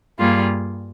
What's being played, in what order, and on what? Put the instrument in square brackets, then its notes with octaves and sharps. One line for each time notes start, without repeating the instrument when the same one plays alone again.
[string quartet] G2 G3 A#3 F4 G#4